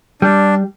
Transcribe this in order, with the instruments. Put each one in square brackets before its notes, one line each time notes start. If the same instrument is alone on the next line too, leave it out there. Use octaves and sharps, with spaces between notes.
[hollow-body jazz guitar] G3 [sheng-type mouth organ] D4